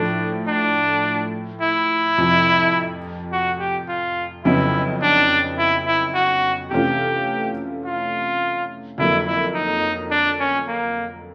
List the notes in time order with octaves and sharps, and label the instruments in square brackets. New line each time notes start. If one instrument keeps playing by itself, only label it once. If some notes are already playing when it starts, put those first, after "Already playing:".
Already playing: [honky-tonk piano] A2 F3 A3 [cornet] D4
[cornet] D4
E4
[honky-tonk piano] F2 C3 F3
[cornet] F#4
G4
F4
[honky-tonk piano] F2 C#3 F#3 B3 D#4 [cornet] E4
[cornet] D4
E4
E4
F#4
[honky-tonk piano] C3 E3 A3 C#4 F4 [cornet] G4
[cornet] F4
[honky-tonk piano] F2 D3 F#3 A#3 [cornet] E4
[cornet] E4
D#4
D4
C#4
A#3